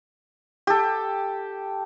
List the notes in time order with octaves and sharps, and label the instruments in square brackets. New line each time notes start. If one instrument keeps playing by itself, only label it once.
[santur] G4 A4